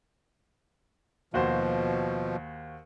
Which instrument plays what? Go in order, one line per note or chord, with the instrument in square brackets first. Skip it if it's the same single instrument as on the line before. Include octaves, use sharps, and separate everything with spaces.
[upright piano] D#2 F#4 C5 [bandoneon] B2 F3